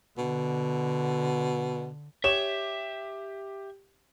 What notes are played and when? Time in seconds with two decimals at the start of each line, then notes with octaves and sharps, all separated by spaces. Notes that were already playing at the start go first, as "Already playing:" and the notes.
0.18 B2 D3
2.24 G4 C#5 E5 E7